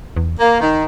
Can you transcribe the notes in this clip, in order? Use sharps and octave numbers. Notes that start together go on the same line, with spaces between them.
E2
A#3
D#3